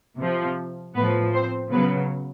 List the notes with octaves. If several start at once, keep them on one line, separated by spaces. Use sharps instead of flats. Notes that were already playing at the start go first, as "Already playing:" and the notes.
C3 F3
A2 F3 B3 B4
C4 C5
C#3 F#3 B3 B4